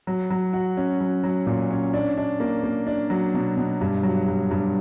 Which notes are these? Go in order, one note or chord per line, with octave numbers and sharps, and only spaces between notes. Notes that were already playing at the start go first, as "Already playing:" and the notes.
F#3
F#3
F#4
C#4
F#3
F#3
A#2
C#4
D4
D4
A#3
A#3
D4
F#3
B2
B2
G2
F#3
G2
G2